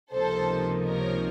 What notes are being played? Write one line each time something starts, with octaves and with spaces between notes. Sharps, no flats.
C#2 C3 F3 A#3 D#4 A4 C5
A#4 C#5